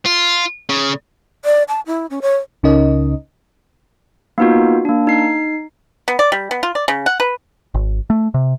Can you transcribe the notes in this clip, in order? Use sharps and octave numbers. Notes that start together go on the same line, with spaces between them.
F4
C#3
D5
A5
E4
C#4
C#5
C#2 C#3 C#4 D#4 A#4 D#5
A#3 B3 D#4 F4 F#4
A#3 D4
D#4 C7
B3
D5
G3
B3
F4
D5
C#3
F#5
B4
G#1
A3
C3